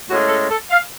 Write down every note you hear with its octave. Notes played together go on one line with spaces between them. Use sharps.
A2 G#3 C#4 F#4
A4
A4
F5